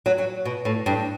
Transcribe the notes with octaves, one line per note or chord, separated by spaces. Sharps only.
F#3
F#3
B2
A2
G2